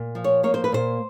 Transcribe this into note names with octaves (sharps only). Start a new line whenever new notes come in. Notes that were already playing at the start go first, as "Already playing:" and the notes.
Already playing: A#2
F3
C#5
A#3 C#5
C5
B4
A#2 C5